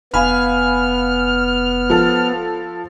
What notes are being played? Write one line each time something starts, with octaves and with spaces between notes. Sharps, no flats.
F1 B3 F5 G#5 B5 F6
F3 A4